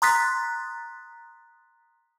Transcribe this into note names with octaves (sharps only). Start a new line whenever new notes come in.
A#5 C6 D#6 F#6 A6 B6